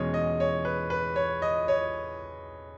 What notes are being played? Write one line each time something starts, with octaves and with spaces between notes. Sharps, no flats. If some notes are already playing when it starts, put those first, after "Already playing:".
Already playing: E2 B2 G#3 C#4 C#5 D#5
D#5
C#5
B4
B4
C#5
D#5
C#5